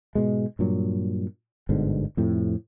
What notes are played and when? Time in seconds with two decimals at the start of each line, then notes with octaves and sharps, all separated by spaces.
0.15 G#2 B2 G#3
0.59 G2 A#2 F#3
1.69 G1 G#2 B2 D3
2.17 F2 A2 C3